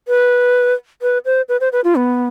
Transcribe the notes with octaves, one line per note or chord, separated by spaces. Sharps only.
B4
B4
C5
B4
C5
B4
F4
B3